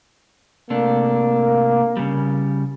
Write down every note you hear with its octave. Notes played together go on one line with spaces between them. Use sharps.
C3 A3 A#3 D4
C#3 G3